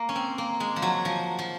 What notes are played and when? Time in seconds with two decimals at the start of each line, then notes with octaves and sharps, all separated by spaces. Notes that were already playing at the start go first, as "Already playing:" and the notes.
Already playing: A#3
0.09 C#4
0.16 C4
0.38 A#3
0.60 G#3
0.76 F3
0.82 F#3
1.05 F3
1.39 F3